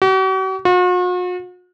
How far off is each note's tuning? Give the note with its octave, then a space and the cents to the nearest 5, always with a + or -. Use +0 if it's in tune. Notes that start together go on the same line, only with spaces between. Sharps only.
F#4 +45
F#4 -45